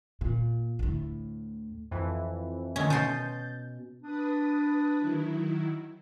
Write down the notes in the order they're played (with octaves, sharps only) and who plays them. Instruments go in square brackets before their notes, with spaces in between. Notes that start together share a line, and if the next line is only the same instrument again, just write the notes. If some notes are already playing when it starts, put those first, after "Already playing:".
[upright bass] A#2
D2 A2
[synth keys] F2 E3
[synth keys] D3 D#3 A3 [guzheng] C#4
[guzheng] B2 C6 [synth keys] G6 A6
[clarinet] D4 [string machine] B4 D#6
[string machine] D#3 F#3 E4